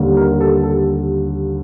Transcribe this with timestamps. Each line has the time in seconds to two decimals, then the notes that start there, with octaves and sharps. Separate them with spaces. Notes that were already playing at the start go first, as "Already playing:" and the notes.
Already playing: D#2 D3 G3 A#3
0.17 A#4
0.41 A4
0.63 A4